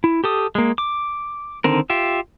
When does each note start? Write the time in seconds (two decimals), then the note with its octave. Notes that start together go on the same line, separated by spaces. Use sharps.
0.04 E4
0.24 G4 A4 D#6
0.55 G#3 A#3
0.78 D6
1.64 D3 D#3 C4 A#4
1.90 F4 G4 E5